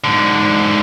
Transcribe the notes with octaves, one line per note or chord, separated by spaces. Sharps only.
G#2 D3